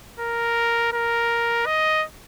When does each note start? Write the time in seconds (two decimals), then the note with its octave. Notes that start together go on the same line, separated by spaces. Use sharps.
0.20 A#4
0.93 A#4
1.66 D#5